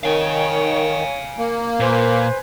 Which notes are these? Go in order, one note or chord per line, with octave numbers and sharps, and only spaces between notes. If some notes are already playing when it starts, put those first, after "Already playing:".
D#3 C#5 F5 G#5
A#3
A#2 B4 C5 G#5